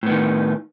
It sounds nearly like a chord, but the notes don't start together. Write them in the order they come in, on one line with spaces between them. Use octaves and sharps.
A2 B3 D#3